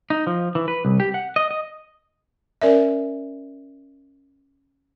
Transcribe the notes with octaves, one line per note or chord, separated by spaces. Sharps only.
D#4
F3
E3
B4
C2
G4
F#5
D#5
D#5
C#4 A#4 D5 E5